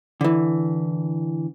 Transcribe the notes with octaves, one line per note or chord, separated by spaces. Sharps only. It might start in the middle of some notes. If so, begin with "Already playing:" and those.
D3 E3